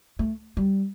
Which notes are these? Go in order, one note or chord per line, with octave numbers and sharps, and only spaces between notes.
A3
G3